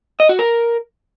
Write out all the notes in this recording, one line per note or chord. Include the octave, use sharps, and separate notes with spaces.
D#5
F#4
A#4